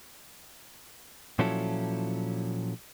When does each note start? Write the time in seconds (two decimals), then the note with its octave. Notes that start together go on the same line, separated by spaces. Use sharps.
1.39 A#2 F3 F#3 C#4 E4 A4